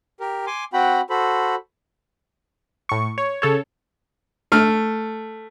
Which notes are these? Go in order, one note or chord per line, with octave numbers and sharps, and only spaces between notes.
G4 A#4
G#5 C6 D6
C4 F#4 F#5 G5 B5
F#4 A4 C5 B5
A2 C#6
C#5
C#3 A4 C#5
A3 F6